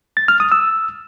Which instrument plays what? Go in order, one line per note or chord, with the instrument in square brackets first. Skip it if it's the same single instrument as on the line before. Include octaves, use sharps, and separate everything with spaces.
[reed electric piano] A6
F6
D#6
E6